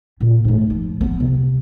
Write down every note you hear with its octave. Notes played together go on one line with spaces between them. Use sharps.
A#2
G#2 A3
F3
B3
C3